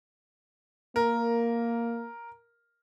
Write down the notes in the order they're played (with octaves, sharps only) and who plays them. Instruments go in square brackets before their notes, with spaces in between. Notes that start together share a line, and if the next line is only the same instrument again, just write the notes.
[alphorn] A#3 [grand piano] A#4